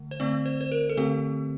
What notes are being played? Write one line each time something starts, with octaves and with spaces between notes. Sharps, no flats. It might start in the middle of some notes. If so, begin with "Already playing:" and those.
Already playing: D3 A3
C5
D3 A3 C4 D5
C5
C5
A#4
A4
D3 A3 C4 G4